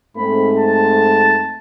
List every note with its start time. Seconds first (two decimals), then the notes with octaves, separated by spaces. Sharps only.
0.17 G#2 A3 C4 B5
0.56 A5